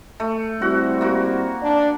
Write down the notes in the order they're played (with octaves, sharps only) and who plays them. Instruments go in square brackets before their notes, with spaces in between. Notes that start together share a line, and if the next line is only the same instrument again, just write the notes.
[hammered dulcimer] A3
[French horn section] G3 C4 E4 [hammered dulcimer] F#4
[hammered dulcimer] A#3 F#4
[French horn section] D4